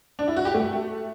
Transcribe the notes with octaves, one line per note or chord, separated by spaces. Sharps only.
D4
E4
F#4
G4
A3